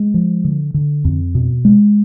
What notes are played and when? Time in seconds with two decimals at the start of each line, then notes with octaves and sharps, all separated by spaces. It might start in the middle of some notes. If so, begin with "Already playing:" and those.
Already playing: G#3
0.14 F3
0.45 D3
0.74 D3
1.05 F2
1.35 B2
1.65 G#3